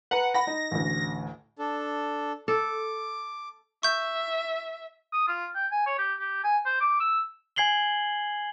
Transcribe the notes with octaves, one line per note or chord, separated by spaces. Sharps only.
B4 F#5 A#5
F#5 B5 A#6
D#4
A1 D2
D4 A4
A4 D6
E5 C#6 G6
D#6
F4
G5
G#5
C#5
G4
G4
G#5
C5
D6
E6
G#5 G#6 C7 F#7 G7